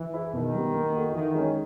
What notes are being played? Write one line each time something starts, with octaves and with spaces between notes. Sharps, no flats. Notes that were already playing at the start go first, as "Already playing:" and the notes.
Already playing: E3
E4 G#4 B4 E5
B2 D#3
G3 B3
A#3
D#4 F#4 A4
D#3 E3
G#3 C#4